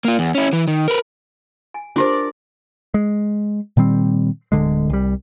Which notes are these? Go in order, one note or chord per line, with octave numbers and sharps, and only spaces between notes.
A#3 F4
E2
C#4 E4
E3
D#3
A#4 B4
G#5
D4 F4 G4 A#4 C5 D5
G#3
A#2 D#3 G3 C4
D1 E2 D3 G#3
C2 G3